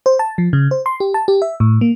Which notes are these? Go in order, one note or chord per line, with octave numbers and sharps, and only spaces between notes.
C5
A5
F3
C#3
C5
C6
G4
A5
G4
E5
A2
A#3